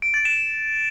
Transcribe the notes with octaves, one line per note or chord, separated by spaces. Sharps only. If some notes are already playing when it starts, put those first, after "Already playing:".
D7
A6
E7